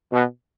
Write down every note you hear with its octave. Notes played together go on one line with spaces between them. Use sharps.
B2